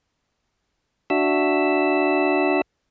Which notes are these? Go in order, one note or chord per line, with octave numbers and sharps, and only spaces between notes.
D4 F#4 E5 E6